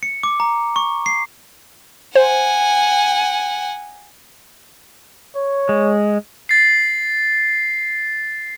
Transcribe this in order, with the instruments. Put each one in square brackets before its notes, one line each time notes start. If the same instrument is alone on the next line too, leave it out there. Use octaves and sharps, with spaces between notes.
[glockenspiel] C#7
D6
A#5
C#6
C7
[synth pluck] C5 [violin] F#5 G#5
[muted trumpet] C#5
[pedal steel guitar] G#3
[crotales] A6 C7